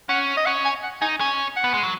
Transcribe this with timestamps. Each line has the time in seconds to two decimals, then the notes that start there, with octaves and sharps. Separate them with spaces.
0.09 C#4 F#5
0.37 D#5
0.46 C#4 F#5
0.65 G#5
0.83 F#5
1.01 D#4 G#5
1.20 C#4 G#5
1.56 F#5
1.64 B3
1.74 G#3
1.83 F#3